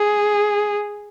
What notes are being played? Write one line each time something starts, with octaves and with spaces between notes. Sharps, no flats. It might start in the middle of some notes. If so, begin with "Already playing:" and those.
Already playing: G#4